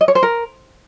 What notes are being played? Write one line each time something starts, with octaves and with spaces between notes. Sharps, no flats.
D#5
C#5
C5
A#4